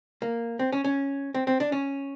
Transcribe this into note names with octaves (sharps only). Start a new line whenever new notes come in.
A#3
C4
C#4
C#4
C4
C4
D4
C#4